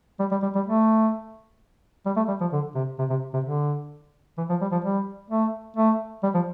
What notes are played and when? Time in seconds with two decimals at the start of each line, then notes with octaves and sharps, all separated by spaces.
0.20 G3
0.31 G3
0.42 G3
0.55 G3
0.66 A3
2.06 G3
2.16 A3
2.28 G3
2.41 F3
2.52 D3
2.75 C3
2.99 C3
3.10 C3
3.34 C3
3.44 D3
4.38 E3
4.49 F3
4.61 G3
4.72 F3
4.85 G3
5.31 A3
5.76 A3
6.23 G3
6.34 F3